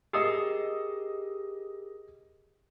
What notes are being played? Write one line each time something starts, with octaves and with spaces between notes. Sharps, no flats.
G4 G#4 A#4 D#5 D#6 E6